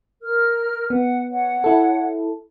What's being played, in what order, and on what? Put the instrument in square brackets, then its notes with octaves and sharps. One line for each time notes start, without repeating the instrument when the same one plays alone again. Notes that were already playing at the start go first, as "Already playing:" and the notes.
[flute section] A#4 F6
[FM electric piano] B3 [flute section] F#5
[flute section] C#5 F#5
[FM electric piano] E4 A4